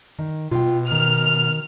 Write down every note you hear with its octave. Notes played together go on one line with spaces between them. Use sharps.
D#3
B2 F4 G5
D#3 F6